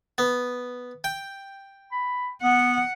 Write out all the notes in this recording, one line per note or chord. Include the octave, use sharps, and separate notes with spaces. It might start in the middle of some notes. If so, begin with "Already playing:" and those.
B3
G5
B5
B3 F#5